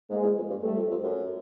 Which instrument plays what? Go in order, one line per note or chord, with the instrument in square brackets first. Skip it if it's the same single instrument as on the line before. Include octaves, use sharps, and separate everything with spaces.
[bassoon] G#2 [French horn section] G#3 A#3
[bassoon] E2
F2
G2
[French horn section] G3 A3
[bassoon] F2
F2
F#2